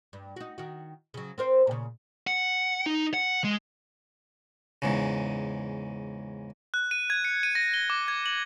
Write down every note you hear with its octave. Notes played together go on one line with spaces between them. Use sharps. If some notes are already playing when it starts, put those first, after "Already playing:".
G2
D#4 F#4
D#3 F#4
C#3 F#3
C4 A#4 C5
A#2 C#3
F#5
D#4
F#5
G#3
E2 G#2 C#3
F#6
D#7
G#6
C#7
D#7
A#6
G7
D6
G#6
F#7